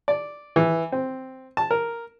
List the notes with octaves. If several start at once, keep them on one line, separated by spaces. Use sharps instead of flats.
D5
E3
C4
A5
A#4